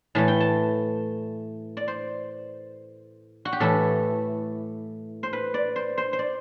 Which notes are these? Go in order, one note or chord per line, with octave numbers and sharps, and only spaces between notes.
A2 E3 A3 A5
G5
A5
D5
C5
F#4
G4
A2 E3 A3 E4 A4
C5
B4
D5
C5
C5
C5
D5